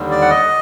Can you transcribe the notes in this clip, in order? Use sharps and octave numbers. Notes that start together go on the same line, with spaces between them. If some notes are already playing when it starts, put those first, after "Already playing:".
Already playing: D#2 D3 G3
D5
F#5
D#5